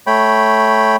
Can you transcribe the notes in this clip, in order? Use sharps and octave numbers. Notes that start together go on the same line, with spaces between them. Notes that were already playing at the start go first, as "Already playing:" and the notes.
A3 C#5 G5 B5